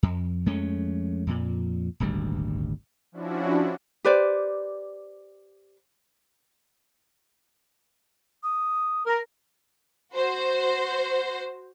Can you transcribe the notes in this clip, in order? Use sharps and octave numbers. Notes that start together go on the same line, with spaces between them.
F2
F2 G#3 A3 C#4
F2 A#2
D#1 G#1 D2 G3
F3 C#4 D4 E4 F#4
G4 B4 C5 D5
D#6
A#4
F#4 C5